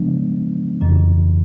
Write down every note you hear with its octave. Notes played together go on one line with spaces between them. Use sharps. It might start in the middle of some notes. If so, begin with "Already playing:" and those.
Already playing: C#3 F3 G#3 B3 D4
F2 C#3 E3